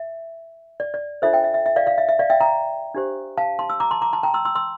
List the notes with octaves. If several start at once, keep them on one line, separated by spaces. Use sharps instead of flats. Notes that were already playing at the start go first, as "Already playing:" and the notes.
Already playing: E5
D5
D5
D4 F4 A4 C5 E5
E5 G5
E5
E5
E5
D5 F5
D5 F5
E5
E5
D5 F5
E5 G5
G5 A#5
D4 G4 C5
F5 A5
A5 C6
E6
A#5 D6
A5 C6
A#5 D6
A5 C6
G5 A#5
C6 E6
C6 E6
C6 E6